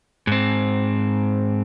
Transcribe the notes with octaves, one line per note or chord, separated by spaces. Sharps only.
G#2 C4